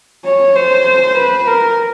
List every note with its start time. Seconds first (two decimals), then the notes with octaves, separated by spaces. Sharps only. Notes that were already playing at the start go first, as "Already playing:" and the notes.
0.25 C#5
0.55 C5
1.16 B4
1.47 A#4